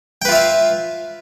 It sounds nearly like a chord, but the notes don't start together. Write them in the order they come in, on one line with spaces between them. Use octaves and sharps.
G5 B4 F4 E5 F5